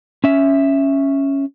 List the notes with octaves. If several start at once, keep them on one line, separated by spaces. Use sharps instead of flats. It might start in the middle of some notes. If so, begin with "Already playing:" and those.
C#4 E5